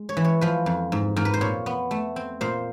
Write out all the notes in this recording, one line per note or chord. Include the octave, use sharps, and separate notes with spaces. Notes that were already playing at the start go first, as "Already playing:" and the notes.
Already playing: G#3
C#5
E3
C#5
F3 B4
F2
G#2
G#2 A#4
B4
C5
A#2 C#5
B3
A3
C4
A#2 C5